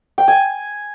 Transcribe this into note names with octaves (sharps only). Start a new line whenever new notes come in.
G5
G#5